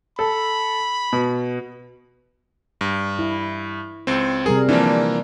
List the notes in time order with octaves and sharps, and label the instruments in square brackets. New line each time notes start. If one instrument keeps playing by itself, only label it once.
[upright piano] A4 [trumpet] B5
[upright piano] B2
[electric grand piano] G2
[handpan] E4
[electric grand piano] C#2 C4
[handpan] C3 G3 A#4 [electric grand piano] G#4
[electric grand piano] E3 F3 A#3 [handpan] D4